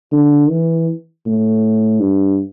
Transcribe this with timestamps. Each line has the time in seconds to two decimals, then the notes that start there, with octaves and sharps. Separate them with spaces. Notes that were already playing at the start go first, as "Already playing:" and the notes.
0.12 D3
0.50 E3
1.26 A2
2.00 G2